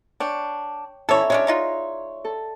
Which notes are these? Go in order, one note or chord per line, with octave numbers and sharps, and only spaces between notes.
D4 C#5 G5
E3 C#4 E4 A4 C#5 D5 E5 A#5
G#3 C#4 D4 C#5
G#3 D#4 F4
A4